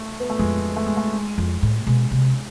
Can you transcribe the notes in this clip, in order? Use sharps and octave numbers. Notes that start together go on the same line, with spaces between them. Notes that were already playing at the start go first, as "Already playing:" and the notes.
Already playing: A3
B3
A3
F2 G#3
A3
G#3
A3
G#3
F2
A2
B2 G#3
C3